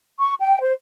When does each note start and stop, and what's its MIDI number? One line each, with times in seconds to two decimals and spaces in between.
0.19 0.34 85
0.39 0.57 79
0.61 0.73 72